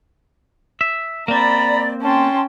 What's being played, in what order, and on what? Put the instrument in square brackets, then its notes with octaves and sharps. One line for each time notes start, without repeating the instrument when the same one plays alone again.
[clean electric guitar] E5
[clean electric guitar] A#3 C4 [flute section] D5 [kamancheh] A#5 B5
[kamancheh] C#4 G5 [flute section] A5 C6